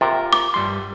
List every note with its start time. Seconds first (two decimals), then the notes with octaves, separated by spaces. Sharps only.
0.01 C3 F4 A#4
0.33 D6
0.54 G2 G3 C6